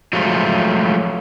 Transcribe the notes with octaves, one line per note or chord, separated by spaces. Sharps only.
F3 F#3 G#3 A3 F4